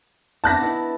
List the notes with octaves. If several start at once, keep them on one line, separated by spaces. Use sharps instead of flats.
B3 D4 A5 F#6 A#6
D#4 E4 B4